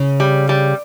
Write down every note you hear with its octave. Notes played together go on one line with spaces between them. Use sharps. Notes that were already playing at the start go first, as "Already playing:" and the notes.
Already playing: C#3
G3
G3